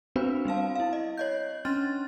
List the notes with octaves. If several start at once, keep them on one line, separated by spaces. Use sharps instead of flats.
B3 C4 D4 F#4 B4 C5
G3 C4 F5 A5
E4 F5
D#5
C#5 D#5 G6
C#4 D4 C6 F6 A6